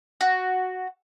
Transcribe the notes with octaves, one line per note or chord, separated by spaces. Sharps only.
F#4